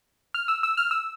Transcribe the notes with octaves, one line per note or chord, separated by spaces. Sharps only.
F6
E6
E6
F6
E6